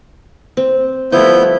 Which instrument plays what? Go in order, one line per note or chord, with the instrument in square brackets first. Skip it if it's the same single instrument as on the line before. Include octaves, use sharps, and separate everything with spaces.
[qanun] C4
[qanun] F3 G3 A3 [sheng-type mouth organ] B3 E4 G6